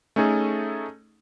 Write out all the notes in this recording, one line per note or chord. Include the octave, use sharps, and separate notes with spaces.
A3 C#4 D#4 G#4 A4